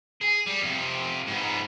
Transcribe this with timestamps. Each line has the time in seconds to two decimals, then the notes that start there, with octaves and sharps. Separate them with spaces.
0.21 G#4
0.46 G3
0.61 F2 C3
1.27 G#2 B3